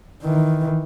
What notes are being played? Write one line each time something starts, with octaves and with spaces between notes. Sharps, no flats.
D#3 E3